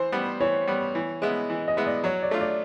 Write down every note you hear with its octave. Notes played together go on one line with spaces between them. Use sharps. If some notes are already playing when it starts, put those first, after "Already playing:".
Already playing: E3 C5
G3 B3
E3 C#5
G3 B3
E3
G#3 B3 E4
E3
D#5
G#3 B3 E4
D5
F#3 C#5
D5
A3 D4 F4
D5